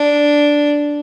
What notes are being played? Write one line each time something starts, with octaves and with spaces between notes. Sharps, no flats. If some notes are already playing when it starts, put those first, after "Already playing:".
Already playing: D4